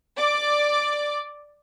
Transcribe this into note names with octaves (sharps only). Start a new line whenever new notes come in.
D5 D6